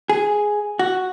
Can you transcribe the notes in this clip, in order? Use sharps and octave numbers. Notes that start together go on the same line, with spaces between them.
G#4
F#4